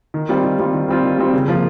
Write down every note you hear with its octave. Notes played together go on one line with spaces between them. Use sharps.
D#3
G3 C4 F4
D#3
G3 C4 F4
D#3
G3 C4 F4
D#3
G3 C4 F4
C#3
F3 A#3 F4